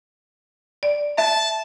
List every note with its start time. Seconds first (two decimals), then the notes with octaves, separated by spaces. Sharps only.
0.83 D5
1.18 E5 A5